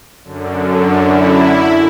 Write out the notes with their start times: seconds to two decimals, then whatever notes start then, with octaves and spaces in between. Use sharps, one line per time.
0.24 F#2 D3
1.01 E4